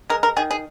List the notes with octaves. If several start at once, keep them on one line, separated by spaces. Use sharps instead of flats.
G#3 A#4
A#4
D#3 G#4
G#4